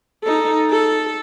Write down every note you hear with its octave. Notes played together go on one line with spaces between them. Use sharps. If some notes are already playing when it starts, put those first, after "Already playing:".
D#4 A4
A4